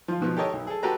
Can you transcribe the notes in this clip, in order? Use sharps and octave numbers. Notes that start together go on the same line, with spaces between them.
F3 F4
G#2 B2 F3
G4 A4 A#4 C#5 D#5 G5
B1
G#4 A4
F#4 G4 A4 B4 A#5